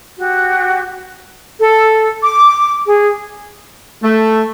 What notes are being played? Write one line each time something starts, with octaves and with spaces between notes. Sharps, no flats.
F#4 G4
A4
D6
G#4
A3